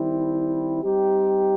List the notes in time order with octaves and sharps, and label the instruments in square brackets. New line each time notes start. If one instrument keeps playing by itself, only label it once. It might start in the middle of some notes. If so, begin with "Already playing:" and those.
Already playing: [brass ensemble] D#3 G3 C4 E4
G3 C4 D#4 G4